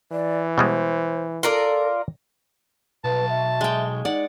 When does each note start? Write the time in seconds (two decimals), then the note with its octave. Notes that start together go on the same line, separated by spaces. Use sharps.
0.12 E3 D5
0.58 B2 G3 G#3 C5
1.43 F4 A4 A#4 D5
3.04 B1 B4 A5
3.29 E5
3.61 G#3 G5
4.05 D#4 D5 F#5